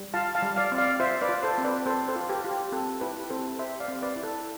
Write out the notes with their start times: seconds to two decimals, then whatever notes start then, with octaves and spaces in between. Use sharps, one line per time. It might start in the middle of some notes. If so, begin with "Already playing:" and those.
Already playing: G3
0.14 F4 F5 A5
0.35 F5 A5
0.43 G3
0.56 D5 F5
0.72 C4
0.78 D5 F5
1.00 F4 C5 E5
1.22 B4 D5
1.29 F4
1.43 A4 C5
1.58 C4
1.65 B4 D5
1.86 C4 A4 C5
2.08 A4 C5
2.16 F4
2.29 G4 B4
2.45 F4
2.51 G4
2.72 C4 A4
3.01 E4 G4 B4
3.30 C4 A4 C5
3.59 G4 C5 E5
3.80 D5 F5
3.88 C4
4.02 B4 D5
4.16 E4
4.23 A4